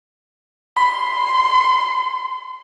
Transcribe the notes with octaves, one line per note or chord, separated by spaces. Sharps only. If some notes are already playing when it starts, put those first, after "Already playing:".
B5 C6